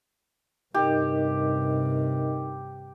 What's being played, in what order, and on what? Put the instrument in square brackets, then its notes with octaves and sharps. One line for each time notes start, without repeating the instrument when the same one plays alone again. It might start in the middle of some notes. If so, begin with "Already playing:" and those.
[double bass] G2 C3 [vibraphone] D#4 A#4 D#5 [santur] G4